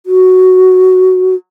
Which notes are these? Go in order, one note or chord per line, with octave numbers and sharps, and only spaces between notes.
F#4